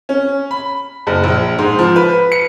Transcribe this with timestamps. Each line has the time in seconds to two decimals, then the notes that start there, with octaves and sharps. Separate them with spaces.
0.09 C#4
0.51 B5
1.07 F#1
1.24 A#1
1.59 G#2
1.79 F3
1.96 B4
2.32 C#7